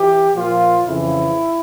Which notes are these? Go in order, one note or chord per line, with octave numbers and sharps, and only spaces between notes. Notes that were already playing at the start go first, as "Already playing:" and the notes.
Already playing: E3 G4
A#2 F3 F4
F2 C#3 E3 E4